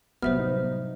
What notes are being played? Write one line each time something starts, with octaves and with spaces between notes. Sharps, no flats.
A2 C3 F#3 G3 B3 C5 E5 F6
D#4